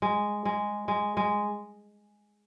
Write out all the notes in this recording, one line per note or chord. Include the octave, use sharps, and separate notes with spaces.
G#3
G#3
G#3
G#3